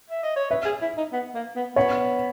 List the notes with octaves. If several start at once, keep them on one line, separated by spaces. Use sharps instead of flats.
E5
D#5
C#5
B4 E5
G#4
E4
D#4
B3
A#3
B3
B3 C#5